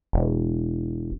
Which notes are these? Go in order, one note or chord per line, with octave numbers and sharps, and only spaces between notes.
E1